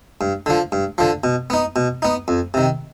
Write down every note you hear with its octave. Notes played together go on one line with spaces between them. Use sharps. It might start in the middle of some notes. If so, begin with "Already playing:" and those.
G2
D3 F3
G2
D3 F3
B2
B3 D#4
B2
B3 D#4
F2
C3 D#3